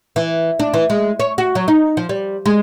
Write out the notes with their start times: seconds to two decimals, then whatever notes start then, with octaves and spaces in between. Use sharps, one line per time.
0.16 E3
0.59 D4
0.74 E3
0.90 G#3
1.20 C#5
1.38 F#4
1.55 F#3
1.68 D#4
1.97 F3
2.09 G3
2.46 G#3